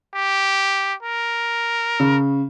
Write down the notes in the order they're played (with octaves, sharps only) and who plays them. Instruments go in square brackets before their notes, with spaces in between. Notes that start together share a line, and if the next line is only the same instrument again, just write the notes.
[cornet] G4
A#4
[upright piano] C#3